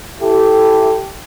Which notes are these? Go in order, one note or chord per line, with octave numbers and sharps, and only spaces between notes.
E4 G4 A4